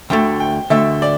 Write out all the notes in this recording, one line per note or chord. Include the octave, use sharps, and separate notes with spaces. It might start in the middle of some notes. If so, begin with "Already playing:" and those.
D2 D3 A3 G5
G5
D2 D3 A3 E5
D5